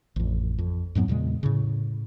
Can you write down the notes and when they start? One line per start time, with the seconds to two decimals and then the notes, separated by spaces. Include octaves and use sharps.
0.16 A1 F2
0.58 F2
0.95 F2 G#2 F#3 B3
1.08 E2 A#2 C#3 G#3
1.43 A2 C#3